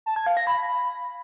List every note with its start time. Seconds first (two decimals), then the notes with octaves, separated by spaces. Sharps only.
0.06 A5
0.16 G#6
0.27 F5
0.37 A#6
0.47 B5